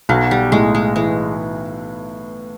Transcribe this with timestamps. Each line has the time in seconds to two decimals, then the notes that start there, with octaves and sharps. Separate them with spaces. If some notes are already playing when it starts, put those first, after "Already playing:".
0.09 B1 F#3
0.31 G3
0.52 A2 G#3
0.75 G#3
0.96 E3 G#3